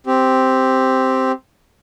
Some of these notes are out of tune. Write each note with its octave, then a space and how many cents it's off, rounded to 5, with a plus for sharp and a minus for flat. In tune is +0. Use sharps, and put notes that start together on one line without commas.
C4 +0 G4 +0